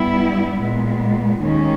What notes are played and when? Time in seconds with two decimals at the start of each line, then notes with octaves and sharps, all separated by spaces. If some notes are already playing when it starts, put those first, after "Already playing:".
Already playing: G2 G3 B3 E4
0.61 A#2 G#3 B3
1.42 D#2 D#3 G#3 C#4